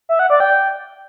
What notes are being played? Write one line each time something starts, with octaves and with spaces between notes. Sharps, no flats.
E5
F#5
D5
G5